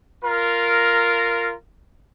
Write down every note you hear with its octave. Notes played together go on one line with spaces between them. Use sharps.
F4 A#4